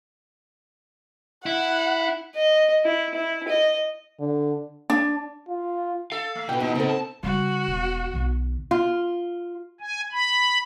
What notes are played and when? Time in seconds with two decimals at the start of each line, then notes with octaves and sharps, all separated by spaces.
1.46 E4 F#5
2.35 D#5
2.84 E4
3.14 E4
3.48 D#5
4.20 D3
4.90 D4
5.49 F4
6.12 A4 F5
6.35 A3
6.49 B2 B4 G5
6.60 E2 B3 D#4
6.75 C#3 C4 A4
6.89 A5
7.23 C#3 G3 F#4
7.68 E1
8.14 B1 D#3
8.71 F4
9.81 G#5
10.12 B5